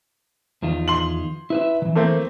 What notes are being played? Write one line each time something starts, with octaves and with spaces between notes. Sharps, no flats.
E2 D#3 F4
C6 F#7
E4 B4 E5
D#3 E3
A3 A#3 C4